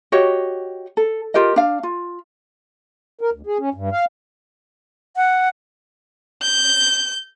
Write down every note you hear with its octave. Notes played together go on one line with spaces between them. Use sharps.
F#4 G4 C#5 D#5
A4
F4 G4 A#4 D#5
D4 F5
F4
A#4
D2
G#4
C#4
G2
F5
F#5
G6